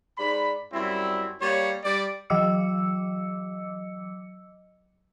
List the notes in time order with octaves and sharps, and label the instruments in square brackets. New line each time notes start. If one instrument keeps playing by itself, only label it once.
[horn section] G#2 D5 B5
F#2 G3 C4 E4
G3 A#3 C#5
G3 D5
[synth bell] E3 F#3 D#5 D6 E6 C#7